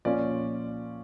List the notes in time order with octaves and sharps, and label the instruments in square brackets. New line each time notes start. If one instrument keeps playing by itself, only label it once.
[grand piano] A#2 F3 C#4 F4 D5